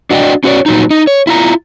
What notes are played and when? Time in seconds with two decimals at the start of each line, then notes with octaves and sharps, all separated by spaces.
0.10 D4 F#4 D5 D#5 F#5 G5
0.44 C#4 F#4 G#4 B4 C#5 D5
0.66 A#2 F#3 D#4
0.90 D#4
1.07 C#5
1.27 E4 F4 A#5